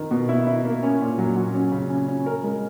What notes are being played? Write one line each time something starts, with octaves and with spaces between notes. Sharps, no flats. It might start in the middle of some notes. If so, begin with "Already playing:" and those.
Already playing: D#3
B2
E4
E4
A#3
C#4
A#2
F#3
F#3
C#4
C#3
C#4
C#4
A#4
G#3